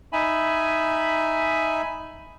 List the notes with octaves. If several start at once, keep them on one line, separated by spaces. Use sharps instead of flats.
D#4 E5 G#5 B5